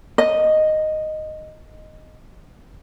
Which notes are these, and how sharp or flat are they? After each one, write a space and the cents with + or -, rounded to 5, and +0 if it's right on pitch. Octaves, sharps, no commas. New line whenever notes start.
D#5 -5